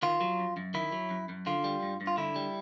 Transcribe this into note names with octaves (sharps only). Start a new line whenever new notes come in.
D#3 F4
F#3
F#2
F#2
D#3 E4
F#3
F#2
F#2
D3 F4
G3
G2
G2
F4
D3 E4
G3